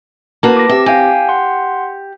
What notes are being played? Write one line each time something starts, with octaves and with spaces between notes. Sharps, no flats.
A#3 F#4 B4 A5
D6 A#6
C4 G4 E5
G4 F5 G5 G#5
F#5 C6